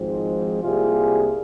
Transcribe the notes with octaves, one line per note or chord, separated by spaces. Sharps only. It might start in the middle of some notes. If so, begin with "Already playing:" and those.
Already playing: G#1 G#2 F3 G#3 C4
C2 C3 G3 A#3 F4 G#4